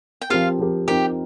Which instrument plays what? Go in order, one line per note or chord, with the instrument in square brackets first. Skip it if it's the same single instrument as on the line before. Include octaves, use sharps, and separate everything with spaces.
[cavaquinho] G5
[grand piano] F3 C4 G4 A#4 [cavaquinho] F4 F5
[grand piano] F3 C4 G4 A#4
[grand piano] F3 C4 D#4 A#4 [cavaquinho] G4 G5